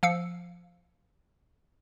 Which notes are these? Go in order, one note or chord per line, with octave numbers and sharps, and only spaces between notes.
F3 F5 E6 C#7